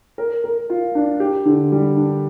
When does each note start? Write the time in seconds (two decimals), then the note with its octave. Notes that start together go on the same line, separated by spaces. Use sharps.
0.18 A#4
0.44 A#4
0.70 F4
0.95 D4
1.20 G4
1.45 D3
1.72 G3
1.97 D4